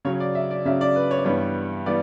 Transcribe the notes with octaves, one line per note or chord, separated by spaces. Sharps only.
C#3 F#3 C#4 C#5
D5
E5
D5
C#3 F#3 C#4 E5
D5
B4
C#5
D5
G2 E3 G3 B3 C#5
E3 G3 B3 D5